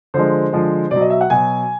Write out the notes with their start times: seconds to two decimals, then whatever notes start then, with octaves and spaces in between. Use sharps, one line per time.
0.14 D3 F3 G#3 C5
0.53 D3 F3 G#3
0.91 B2 F#3 D5
1.01 D#5
1.10 E5
1.21 F#5
1.30 B2 F#3 G#5